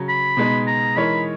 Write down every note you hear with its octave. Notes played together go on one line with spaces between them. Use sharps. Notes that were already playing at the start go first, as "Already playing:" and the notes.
Already playing: C#3 F#3 C#4
B5
B2 G#3 B3 D#4
A#5
E3 G#3 D#4 A#4 C#5 B5